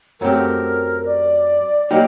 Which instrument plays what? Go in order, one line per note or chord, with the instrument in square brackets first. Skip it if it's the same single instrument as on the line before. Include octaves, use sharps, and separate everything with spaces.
[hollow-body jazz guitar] F#2 F#3 A3 C4 G4 [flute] A#4
[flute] D5
[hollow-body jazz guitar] F#3 A#3 D#4 G4 [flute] D#5